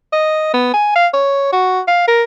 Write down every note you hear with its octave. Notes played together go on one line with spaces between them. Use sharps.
D#5
B3
G#5
F5
C#5
F#4
F5
A#4